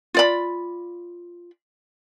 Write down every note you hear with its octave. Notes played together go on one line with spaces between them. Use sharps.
F4 D5 B5